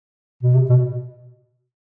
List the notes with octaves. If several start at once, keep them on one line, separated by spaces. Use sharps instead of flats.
B2
C3
B2